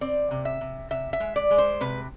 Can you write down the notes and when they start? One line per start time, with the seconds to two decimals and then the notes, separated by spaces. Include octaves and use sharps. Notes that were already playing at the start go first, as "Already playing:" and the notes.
0.01 C4 D5
0.31 C3
0.45 E5
0.61 C3
0.91 C3 E5
1.13 E5
1.20 G#3
1.36 D5
1.51 G#3
1.58 C5
1.81 C3 B4